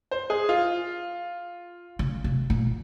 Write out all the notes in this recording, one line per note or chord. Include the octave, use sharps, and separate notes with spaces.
C5
G#4
F4
C#3
C3
A#2